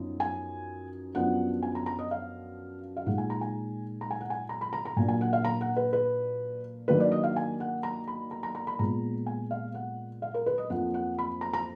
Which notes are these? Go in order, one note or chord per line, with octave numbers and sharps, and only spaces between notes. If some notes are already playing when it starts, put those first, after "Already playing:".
Already playing: F#2 F3 B3 D#4
G#5
F#2 F3 B3 D4 F#5
G#5
A#5
A#5
D#5
F5
F5
A#2 G#3 D#4 F#5
G#5
A#5
G#5
A#5
G#5
F#5
G#5
A#5
B5
A#5
A#5
A#2 F#3 A#3 D4 G#5
G#5
F#5
F5
A#5
F#5
B4
B4
D#3 F#3 A#3 D4 B4
D5
D#5
F5
G#5
F#5
A#5
B5
A#5
A#5
A#5
B5
A#2 G#3 B3 A#5
G#5
F5
F#5
F5
A#4
B4
D#5
F2 F3 A#3 F#5
F#5
B5
A#5
A#5